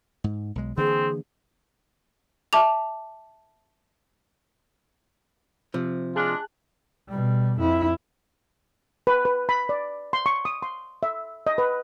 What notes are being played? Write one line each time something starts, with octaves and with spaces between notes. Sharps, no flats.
G#2
B1 G#3
D3 E3 A#3 C4 G#4
E5 A5 D6 F7
C3 F3
G#3 D4 F4 G#4 A5 F#6
B2 G3
F2 E4
B4
B4
B5
D5
C6
C#6
D#6
C6
E5
D#5
B4